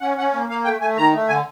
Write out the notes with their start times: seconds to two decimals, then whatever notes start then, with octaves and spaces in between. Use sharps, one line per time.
0.01 C#4 F#5
0.18 C#4 F#5
0.33 A#3
0.49 A#3 F5
0.64 A3 G5
0.80 A3 G#5
0.97 D#3 A#5
1.13 A3
1.28 D3 G#5